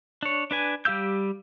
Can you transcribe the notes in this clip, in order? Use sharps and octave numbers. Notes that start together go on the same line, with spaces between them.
D4 C#5
D4 B4 G#5
G3 G4 F5 E6 G6